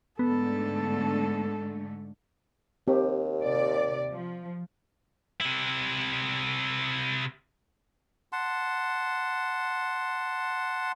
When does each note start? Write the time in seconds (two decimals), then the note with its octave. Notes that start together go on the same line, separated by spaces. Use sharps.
0.19 G#2 D3 A3 B3 A4
2.88 D#2 C4 G4
3.44 C3 D5
4.10 F3
5.41 C3 E4
8.33 F#5 A5 C6